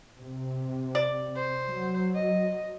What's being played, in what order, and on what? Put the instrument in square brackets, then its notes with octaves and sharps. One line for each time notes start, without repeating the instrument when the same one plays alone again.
[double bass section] C3
[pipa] D5
[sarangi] C5
[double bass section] F#3
[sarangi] D#5